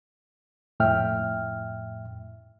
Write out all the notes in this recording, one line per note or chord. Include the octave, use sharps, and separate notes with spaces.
F2 A2 E5 G5 F6